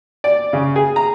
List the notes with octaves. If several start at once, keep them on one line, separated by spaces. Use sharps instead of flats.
D5
C#3
G#4
A#5